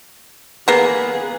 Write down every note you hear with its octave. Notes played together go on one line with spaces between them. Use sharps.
A#3 B3 G#4 B4